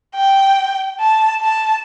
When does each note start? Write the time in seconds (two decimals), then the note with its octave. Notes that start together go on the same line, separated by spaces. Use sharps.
0.16 G5
1.00 A5
1.42 A5